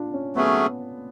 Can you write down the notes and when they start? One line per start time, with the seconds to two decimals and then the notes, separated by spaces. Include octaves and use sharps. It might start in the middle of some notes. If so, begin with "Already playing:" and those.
Already playing: D4 F4
0.14 C#4
0.35 F#3 A3 B3 C#4 G#4